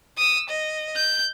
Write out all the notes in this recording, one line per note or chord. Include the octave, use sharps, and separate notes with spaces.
D#6 E6
D#5
G6